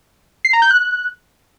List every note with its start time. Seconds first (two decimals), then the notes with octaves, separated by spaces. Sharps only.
0.45 C7
0.53 A#5
0.62 G6
0.71 F#6